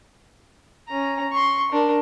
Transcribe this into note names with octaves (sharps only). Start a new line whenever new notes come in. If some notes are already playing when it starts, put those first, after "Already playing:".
C#4 A#5
C6 C#6
D4 A#4